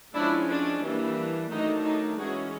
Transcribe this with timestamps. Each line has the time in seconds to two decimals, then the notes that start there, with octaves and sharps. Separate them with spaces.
0.15 F3 G#3 C#4 D4 E4
0.49 D4
0.83 E3 G3 A#3 D4
1.50 D#3 F#3 A3 D4 D#4
1.85 D#4
2.18 E3 G#3 C#4 F#4 G#4